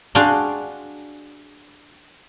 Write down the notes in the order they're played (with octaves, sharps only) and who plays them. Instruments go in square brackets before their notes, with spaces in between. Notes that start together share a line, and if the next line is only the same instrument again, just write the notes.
[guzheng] D4 F#4 G#4 F5 G5 C6